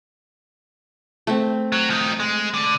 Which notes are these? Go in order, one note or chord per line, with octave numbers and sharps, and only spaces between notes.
A3 C4
F#3
F3 D#4
G#3
D3